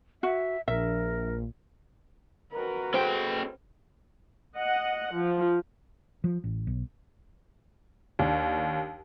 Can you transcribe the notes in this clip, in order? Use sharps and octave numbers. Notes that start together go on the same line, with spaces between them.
F#4 E5
A#1 A#4 E5
F2 F#4 A#4 B4
B2 C#4 G#4 A4 C5 G5
D#5 F#5
F3
F3
A1
B1
D#2 D4